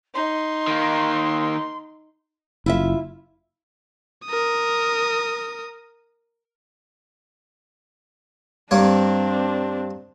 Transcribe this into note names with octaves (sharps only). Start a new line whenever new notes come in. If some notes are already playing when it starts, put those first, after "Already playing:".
D#4 C6
D#3 A#3
F#1 E4 F4 E5
A#4 D#6
G2 A#3 C4 D4 C#5